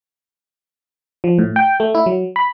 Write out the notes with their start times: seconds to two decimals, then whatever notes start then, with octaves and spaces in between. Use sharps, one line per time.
1.24 F3
1.39 A2
1.56 G5
1.80 A3
1.95 E4
2.06 F#3
2.36 B5